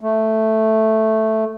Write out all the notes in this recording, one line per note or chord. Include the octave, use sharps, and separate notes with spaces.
A3